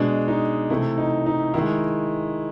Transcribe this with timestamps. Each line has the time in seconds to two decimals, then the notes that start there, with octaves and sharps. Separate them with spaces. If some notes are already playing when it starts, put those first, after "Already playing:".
Already playing: B2 G#3 D4
0.28 D#4
0.70 C3 E3 A3 E4
0.98 D#4
1.26 D#4
1.54 D#3 G#3 E4